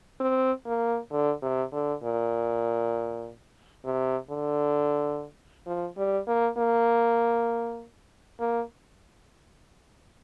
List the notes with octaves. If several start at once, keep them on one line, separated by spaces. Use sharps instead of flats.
C4
A#3
D3
C3
D3
A#2
C3
D3
F3
G3
A#3
A#3
A#3